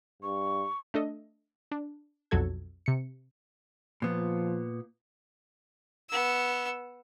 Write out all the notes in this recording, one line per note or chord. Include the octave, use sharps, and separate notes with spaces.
G2 C#6
A3 D4 A4 D#5
D4
B1 F2 F#3 F#4 A4 G#6
C3 C#7
A#2 F3 B3
B3 E6